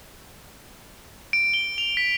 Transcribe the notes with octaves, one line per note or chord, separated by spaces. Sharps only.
D7
G7
F7
B6